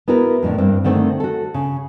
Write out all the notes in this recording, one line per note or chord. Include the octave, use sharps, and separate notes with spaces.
B3 E4 F#4 A#4
F2 A2 D3 D4
G2 A#3 C4
D3 D#3 A3 C4
F#4 A4
C#3